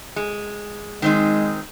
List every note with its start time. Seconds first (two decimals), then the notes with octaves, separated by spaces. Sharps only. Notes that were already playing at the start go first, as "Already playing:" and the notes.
0.16 G#3
1.02 D#3 G#3 C4 D#4